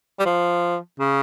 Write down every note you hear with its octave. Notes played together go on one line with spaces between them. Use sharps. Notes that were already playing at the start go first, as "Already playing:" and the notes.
G3
F3
C#3